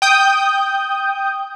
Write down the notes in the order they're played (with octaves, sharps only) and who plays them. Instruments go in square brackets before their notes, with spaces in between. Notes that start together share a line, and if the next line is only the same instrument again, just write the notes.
[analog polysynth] G5 D#6 G6